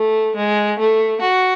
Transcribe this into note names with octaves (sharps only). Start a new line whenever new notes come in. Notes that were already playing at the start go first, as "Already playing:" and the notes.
Already playing: A3
G#3
A3
F#4